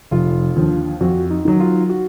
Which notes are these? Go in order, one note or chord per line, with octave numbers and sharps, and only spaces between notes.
F1 F4
D#2 D3 F3
F2 F#4
D#4
D#3 F#3
F4
F#4